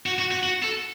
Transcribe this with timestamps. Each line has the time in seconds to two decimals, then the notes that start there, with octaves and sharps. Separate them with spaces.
0.06 F#4
0.19 F#4
0.31 F#4
0.43 F#4
0.63 A4